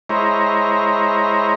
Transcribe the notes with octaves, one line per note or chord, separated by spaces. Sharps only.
G#3 E4 C5 C#5 A#5